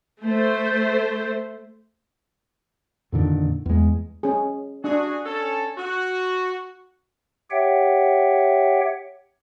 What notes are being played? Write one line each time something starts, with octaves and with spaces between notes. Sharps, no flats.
A3 C5
F2 A#2 D3 D#3
E2 G#3
C#4 G#4
D4 F#4 G#4
C#4 A4
F#4
G4 C#5 E5 F#5 G5